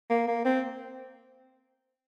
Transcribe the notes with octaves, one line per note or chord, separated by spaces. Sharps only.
A#3
A#3
C4